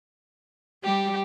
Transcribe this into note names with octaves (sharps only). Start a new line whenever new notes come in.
G3 G4